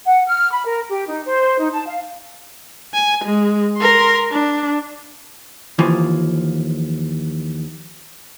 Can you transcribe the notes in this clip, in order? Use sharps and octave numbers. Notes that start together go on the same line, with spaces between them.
F#5
F6
B5
A#4
G4
D#4
C5
D#4
A5
F5
G#5
G#3
A#4 C6
D4
D#2 E3 F3